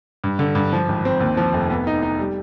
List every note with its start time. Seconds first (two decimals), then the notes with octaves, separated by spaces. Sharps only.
0.24 G2
0.39 D3
0.55 G2
0.73 F3
0.88 G#1
1.05 C4
1.20 D#2
1.37 F3
1.53 F1
1.70 B3
1.87 D#4
2.02 D#4
2.19 G3